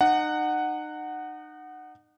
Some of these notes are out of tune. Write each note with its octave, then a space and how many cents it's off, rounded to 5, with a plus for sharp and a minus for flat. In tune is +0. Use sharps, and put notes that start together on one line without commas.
D#4 -35 F#5 +0